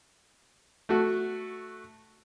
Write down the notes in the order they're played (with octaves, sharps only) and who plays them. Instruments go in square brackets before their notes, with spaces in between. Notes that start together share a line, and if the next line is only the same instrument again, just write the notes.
[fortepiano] A3 F#4